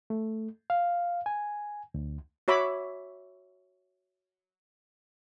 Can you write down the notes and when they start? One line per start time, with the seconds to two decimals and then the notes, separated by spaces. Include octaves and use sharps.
0.10 A3
0.70 F5
1.26 G#5
1.94 D2
2.48 F#4 C#5 E5 B5 D6